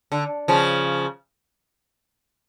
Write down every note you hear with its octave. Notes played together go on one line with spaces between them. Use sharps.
D3
C#3 F3